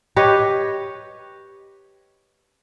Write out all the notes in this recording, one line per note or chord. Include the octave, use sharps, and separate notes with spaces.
G4 B4 C#5 D#5